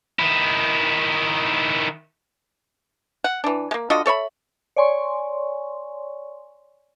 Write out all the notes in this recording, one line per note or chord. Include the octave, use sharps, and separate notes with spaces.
D#3 E4
F#5
E3 D4
G#3 A#3
D3 F4 F#4 D#5
A4 C#5 E5 B5
C#5 D5 G#5 C6 C#6